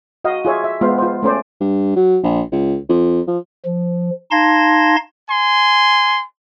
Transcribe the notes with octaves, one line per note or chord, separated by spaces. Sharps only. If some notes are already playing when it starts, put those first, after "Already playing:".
F#4 D#5 F5
F4 G#4 C#5 E5
E5
G#3 B3 F4 C5 F5
F4 C5
A3 C#4 C5 D5
G2
F#3
A#1
C#2
F2
F3
F3
D#4 F5 A5 C6 G#6 A#6
G#5 C6